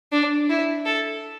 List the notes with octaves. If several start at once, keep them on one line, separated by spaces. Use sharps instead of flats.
D4
E4
A4